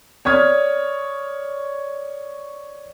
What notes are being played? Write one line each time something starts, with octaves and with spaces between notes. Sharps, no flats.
C#5 D5 D#6 F6 G#6